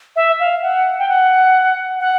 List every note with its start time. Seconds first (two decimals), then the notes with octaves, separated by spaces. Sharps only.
0.16 E5
0.40 F5
0.62 F#5
0.99 G5
1.09 F#5
2.00 F#5